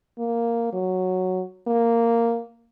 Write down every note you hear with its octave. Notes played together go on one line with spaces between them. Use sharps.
A#3
F#3
A#3